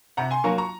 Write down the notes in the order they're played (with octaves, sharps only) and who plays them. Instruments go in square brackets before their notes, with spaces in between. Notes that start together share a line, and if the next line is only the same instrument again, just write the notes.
[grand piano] C3 F#5 A#5
G#5 C6
F#3 A#3 A#5 C#6
A#5 C#6